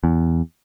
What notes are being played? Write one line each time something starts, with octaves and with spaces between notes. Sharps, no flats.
E2